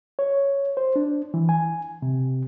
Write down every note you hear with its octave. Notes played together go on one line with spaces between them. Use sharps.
C#5
C5
D4
E3
G#5
C3